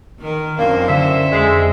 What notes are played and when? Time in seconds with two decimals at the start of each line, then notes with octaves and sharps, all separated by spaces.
0.20 D#3 A#4
0.58 F#2 F#3 A#3 C4 D4 E4 C5
0.88 D3 E5
1.32 F2 G#3 E7